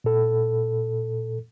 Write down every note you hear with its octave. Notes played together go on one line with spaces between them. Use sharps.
A#2 A4